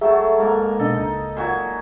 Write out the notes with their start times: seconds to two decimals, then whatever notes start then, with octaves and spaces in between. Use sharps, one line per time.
0.01 F#3 A3 G#4 E5 A5
0.38 G#2 A#3 A#4
0.79 B2 D4 A4 D#5
0.97 C#2 D#4
1.37 A#2 F#3 G#5